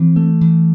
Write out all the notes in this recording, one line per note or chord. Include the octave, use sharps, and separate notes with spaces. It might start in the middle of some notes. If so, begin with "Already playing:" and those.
Already playing: E3 C4
A3
E3